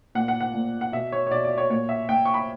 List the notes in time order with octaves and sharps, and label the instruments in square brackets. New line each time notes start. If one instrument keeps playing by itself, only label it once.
[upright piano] A#2 F#5
F#5
F#5
A#2
F#5
B2 E5
C#5
C#5
B2 D5
D5
C#5
A#2 C#5
E5
A#2 G5
C#6
B5